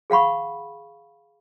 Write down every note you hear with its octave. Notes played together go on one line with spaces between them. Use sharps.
G#4 F5 F#5 B5 C#6